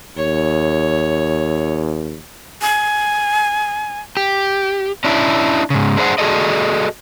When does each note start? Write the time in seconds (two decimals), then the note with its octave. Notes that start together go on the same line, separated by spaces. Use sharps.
0.17 D#2 C#5
2.62 G#5
4.17 G4
5.04 C#4 D4 E4
5.70 G#2 C#3
5.97 D4 G#4 C5 D#5 F#5
6.18 F#4 G#4 A4 D5 D#5